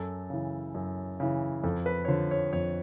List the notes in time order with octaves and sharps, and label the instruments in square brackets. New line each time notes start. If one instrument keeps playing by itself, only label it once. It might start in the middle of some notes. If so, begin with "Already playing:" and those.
Already playing: [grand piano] F#2 A4
C#3 E3
F#2
C#3 E3
F2 A4
B4
C#5
D3 F3 C5
C#5
F2 C#5